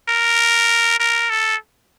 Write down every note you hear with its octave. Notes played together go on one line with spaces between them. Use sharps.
A#4
A#4
A4